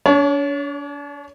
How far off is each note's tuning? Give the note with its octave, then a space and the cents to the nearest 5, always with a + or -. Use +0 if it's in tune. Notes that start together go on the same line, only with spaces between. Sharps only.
D4 -40 C#5 +20